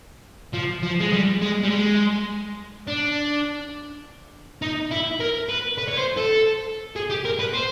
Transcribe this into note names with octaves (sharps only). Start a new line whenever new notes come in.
F3
F3
G#3
G3
G#3
G3
G#3
D4
D#4
E4
A#4
B4
B4
C#5
C5
A4
G#4
G4
A#4
B4
C5